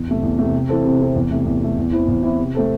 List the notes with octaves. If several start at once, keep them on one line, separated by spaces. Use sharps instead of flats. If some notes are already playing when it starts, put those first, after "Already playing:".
Already playing: E2
C3 A3
E2
C3 A3
C3
E3 C4 A4
C3
E3 C4 A4
E2
C3 A3
E2
C3 A3
E2
E3 C4 E4
E2
E3 C4 E4
C3
A3 C4 A4